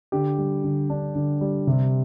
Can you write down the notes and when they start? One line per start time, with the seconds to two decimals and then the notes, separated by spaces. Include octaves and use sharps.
0.12 D3 G4
0.38 G3
0.64 D3
0.90 D4
1.15 D3
1.41 G3
1.67 C3